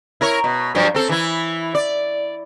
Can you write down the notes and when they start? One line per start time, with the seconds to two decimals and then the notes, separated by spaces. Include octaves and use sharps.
0.21 E4 A#4 C#5
0.44 B2
0.75 G2 F3 F#3
0.95 C4 A4
1.09 E3 E4
1.75 D5